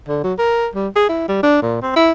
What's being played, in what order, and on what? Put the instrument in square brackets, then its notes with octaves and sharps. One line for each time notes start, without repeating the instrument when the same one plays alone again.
[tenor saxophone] D3
F#3
A#4
G3
G#4
E4
G3
D4
A#2
C4
E4